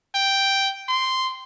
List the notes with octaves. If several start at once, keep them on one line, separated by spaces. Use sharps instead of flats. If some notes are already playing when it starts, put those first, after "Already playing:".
G5
C6